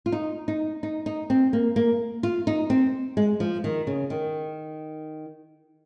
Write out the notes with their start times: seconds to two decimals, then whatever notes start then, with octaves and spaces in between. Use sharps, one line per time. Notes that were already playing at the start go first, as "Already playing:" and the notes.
0.06 F4
0.12 D#4
0.48 D#4
0.83 D#4
1.06 D#4
1.30 C4
1.53 A#3
1.76 A#3
2.23 F4
2.47 D#4
2.70 C4
3.17 G#3
3.40 F3
3.64 D#3
3.87 C#3
4.10 D#3